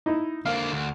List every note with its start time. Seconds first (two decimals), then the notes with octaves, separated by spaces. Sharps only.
0.06 D#4 E4
0.45 D3 A#3 F5
0.72 D2